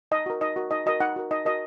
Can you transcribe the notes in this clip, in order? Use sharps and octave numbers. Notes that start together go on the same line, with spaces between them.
D#4 D#5
F#4 A#4
D#4 D#5
F#4 A#4
D#4 D#5
F#4 A#4 D#5
D#4 F#5
F#4 A#4
D#4 D#5
F#4 A#4 D#5